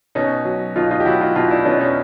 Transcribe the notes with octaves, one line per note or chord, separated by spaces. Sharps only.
B2 C#4 D#4
F#3
B2 D#4 F4
D#4 F4
G4
F#3 E4 F#4
D#4 F4
B2 D#4 F4
D4 E4
B2 C#4 D#4
C#4 D#4